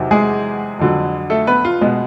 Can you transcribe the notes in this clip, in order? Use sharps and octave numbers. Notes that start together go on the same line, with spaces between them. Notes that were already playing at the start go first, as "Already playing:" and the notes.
Already playing: E2 C3 D#3 F#3
G#3 G#4
F2 D3 F#3
A3 A4
B3 B4
F4
B2 G#3 B3